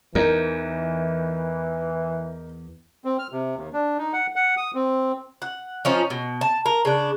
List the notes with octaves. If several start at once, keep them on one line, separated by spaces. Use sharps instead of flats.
E2 E3 D#4 A#4
C4
F6
C3
D#2
D4
D#4
F#5
F#5
D#6
C4
F#5
F3 C#4 D#4 F4
B2
A5
A#4
C#3 D4